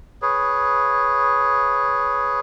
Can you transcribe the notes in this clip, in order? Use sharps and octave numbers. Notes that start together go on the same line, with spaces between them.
G#4 B4 C#5